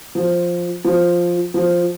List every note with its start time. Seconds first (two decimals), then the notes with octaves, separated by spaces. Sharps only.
0.15 F3
0.85 F3
1.54 F3